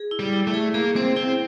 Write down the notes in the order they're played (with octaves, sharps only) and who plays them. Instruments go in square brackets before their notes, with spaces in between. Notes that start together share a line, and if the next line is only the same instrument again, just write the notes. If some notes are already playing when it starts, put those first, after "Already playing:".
Already playing: [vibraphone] G#4
E4
[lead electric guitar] G3
[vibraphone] E4
[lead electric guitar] A3
[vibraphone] G#4
[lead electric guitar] A#3 [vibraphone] G#4
[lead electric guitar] C4 [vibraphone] C5
[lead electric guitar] C4 [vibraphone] E4